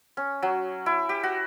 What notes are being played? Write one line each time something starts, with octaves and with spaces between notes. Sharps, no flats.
C#4
F#3
E4
G4
F#4